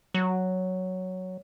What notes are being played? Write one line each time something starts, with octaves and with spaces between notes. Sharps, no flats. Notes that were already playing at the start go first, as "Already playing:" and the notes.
F#3